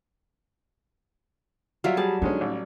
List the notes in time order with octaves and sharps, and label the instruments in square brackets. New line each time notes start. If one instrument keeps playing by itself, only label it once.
[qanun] F#3 G3 [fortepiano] F4 E5
[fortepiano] G3 G#4 [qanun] A5
[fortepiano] D3 G#3 C#4 [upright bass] D#4
[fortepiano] A1